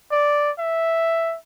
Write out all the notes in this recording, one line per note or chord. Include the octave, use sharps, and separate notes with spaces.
D5
E5